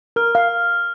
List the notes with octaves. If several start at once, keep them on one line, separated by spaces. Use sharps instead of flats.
A#4 F6
F5